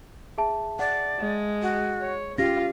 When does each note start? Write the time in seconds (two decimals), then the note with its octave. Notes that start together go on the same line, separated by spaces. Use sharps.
0.38 G#4 E5 A5
0.79 D5 F#5
1.19 G#3
1.63 F#4
2.00 C#5
2.38 C#4 F4 G4 F5 A#6